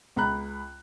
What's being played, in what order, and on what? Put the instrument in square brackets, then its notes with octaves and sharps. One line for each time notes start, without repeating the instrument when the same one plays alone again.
[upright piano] C#2 A#5 B5 F#6